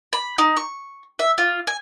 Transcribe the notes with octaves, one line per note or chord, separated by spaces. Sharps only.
B5
D#4
C#6
E5
F4
G#5